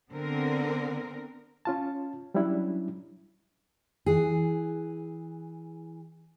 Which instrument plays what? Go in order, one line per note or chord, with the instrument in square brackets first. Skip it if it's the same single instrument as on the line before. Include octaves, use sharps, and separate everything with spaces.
[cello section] D3 B3 C4 A#4
[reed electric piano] C#4 F4 A5
F#3 G3 C#4 D4 E4
[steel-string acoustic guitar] E3 G#4